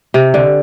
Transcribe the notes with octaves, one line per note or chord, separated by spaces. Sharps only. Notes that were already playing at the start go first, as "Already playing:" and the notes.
C3
D3